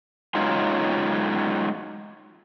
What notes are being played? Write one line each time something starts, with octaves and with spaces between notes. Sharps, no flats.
F#3 G#3 C#4 D#4 F4